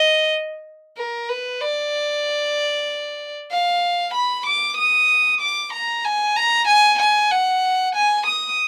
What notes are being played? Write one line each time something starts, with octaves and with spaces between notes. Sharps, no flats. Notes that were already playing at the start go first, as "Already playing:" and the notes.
Already playing: D#5
A#4
B4
D5
F5
B5
D6
D#6
D6
A#5
G#5
A#5
G#5
G#5
F#5
G#5
D#6